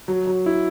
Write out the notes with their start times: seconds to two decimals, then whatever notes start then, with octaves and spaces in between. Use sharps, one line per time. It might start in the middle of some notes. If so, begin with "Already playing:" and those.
0.08 F#3
0.27 F#3
0.46 E4